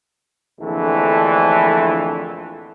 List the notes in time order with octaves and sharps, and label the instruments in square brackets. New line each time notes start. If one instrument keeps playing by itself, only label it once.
[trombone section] A#1 F2 D3 E3 A3